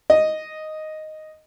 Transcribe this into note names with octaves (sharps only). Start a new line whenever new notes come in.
D#5